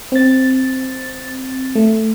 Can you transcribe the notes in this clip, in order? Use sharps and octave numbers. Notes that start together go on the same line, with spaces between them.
C4 A6
A3